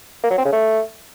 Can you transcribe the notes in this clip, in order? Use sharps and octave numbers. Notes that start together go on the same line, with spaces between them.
A#3
F#3
C4
C#3
A3